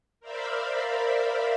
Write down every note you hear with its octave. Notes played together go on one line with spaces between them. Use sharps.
A#4 C5 D5 E5 F5 B5